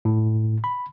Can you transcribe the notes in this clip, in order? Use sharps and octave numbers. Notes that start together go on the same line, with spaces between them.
A2
B5